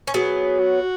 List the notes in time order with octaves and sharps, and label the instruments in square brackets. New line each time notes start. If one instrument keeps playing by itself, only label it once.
[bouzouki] C#4
[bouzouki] F#3 B3 [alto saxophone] G#4
[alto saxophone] F#4